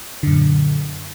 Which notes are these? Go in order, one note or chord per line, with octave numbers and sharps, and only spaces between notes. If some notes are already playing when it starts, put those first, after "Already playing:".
F#2 A#2 D3